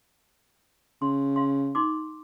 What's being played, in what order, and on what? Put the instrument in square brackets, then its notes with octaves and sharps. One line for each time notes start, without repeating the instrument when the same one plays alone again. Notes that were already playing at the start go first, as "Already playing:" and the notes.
[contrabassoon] C#3 [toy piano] C6
[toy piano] F5 C6
D#4 C6 D6